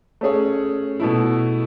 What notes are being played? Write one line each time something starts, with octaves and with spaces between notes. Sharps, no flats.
A3 C#4 G#4 C#5
B2 A3 E4